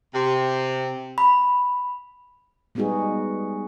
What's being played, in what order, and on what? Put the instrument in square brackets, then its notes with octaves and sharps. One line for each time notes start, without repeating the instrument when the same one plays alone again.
[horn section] C3
[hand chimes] B5
[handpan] G3 G#3 B3 D#4 F#4 G#4